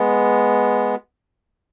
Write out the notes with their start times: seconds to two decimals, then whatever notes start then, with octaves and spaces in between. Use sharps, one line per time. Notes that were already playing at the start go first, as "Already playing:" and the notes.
Already playing: G#3 B3